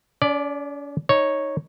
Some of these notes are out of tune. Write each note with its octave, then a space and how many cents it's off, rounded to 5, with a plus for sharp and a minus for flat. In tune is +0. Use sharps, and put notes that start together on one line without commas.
C#4 +45 D5 +0
D#4 +0 C#5 -5